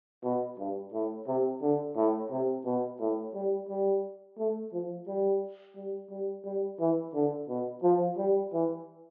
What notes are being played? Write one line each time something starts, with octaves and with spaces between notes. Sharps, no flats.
B2
G2
A2
C3
D3
A2
C3
B2
A2
G3
G3
A3
F3
G3
G3
G3
G3
E3
D3
B2
F3
G3
E3